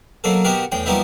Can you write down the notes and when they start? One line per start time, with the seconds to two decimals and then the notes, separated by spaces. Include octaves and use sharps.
0.24 B2 F#3 A#3 A4
0.45 B2 B3 F#4 G4 A#4
0.72 E2 A2 G5
0.86 F3 G3 A#3 B3 D#4 E4